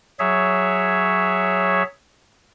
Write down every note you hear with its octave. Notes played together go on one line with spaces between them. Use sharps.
F#3 G#4 C#5 E5